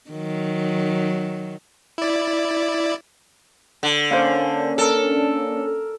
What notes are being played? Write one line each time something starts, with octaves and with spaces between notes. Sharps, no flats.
D#3 F#3
E4 D5
D3
A#3 C#4 D4 C5 F5
A4 A#4 E6